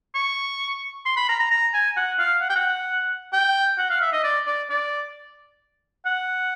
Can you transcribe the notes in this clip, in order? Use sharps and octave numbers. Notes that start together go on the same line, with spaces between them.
C#6
C6
B5
A#5
A#5
A#5
G#5
F#5
F5
F#5
G5
F#5
G5
F#5
F5
E5
D#5
D5
D5
D5
F#5